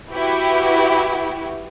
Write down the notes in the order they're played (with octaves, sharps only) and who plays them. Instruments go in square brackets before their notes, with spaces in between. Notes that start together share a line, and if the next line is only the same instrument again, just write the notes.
[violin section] E4 F#4 G4 B4